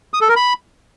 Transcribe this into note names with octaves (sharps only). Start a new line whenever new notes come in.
D#6
A4
A#4
B5